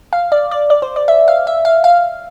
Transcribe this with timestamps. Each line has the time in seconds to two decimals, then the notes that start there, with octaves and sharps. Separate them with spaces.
0.13 F5
0.32 D5
0.51 D5
0.70 D5
0.82 C5
0.96 D5
1.08 E5
1.28 F5
1.47 E5
1.65 F5
1.84 F5